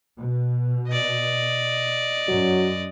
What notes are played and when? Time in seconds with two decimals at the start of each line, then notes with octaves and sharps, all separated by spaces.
0.17 B2
0.88 D5 D#5
2.28 F#2 F#3